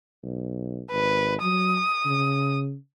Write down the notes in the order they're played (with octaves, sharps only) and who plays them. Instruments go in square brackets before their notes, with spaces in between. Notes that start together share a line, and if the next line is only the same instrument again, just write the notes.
[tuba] B1
[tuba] G#1 [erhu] B4
[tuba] F#3 [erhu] D#6
[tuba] C#3